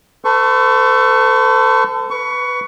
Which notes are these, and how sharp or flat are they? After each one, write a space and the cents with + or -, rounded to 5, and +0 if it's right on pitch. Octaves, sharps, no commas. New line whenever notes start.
A4 +20 C5 -45 C#6 +0
B4 +0 C#6 +20